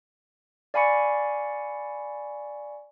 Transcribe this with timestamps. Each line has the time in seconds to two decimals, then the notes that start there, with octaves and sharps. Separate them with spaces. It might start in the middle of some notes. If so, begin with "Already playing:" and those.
0.74 D5 F5 G#5 B5 C#6 C#7